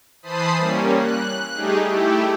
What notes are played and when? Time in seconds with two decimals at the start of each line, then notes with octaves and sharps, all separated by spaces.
0.23 E3 C5 A5 B5 D#6 C7
0.58 G3 A#3 C#4
0.96 F#6
1.54 G3 A3 D#4 G4 G#4
1.84 A3 E4 G4